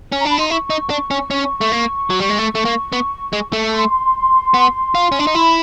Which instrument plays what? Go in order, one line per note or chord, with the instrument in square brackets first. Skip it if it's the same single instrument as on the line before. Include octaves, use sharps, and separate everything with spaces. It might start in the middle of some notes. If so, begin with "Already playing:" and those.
[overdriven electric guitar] C#4
[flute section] A#5
[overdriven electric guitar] D4 [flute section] B5
[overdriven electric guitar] D#4 [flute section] C6
[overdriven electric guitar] E4 [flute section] C#6
[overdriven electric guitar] D#4
D4
C#4
C#4
A3
A#3
F#3
G3
G#3
A3
A3
A#3
B3
G#3
A3
[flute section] C6
[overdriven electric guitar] B3
F4
C#4
D4
D#4
[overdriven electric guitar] E4 [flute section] B5